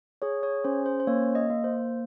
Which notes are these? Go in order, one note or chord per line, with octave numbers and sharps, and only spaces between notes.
G#4 C#5
C#5
C#4 C5
C5
C5
A#3 C#5
D#5
A#3
C5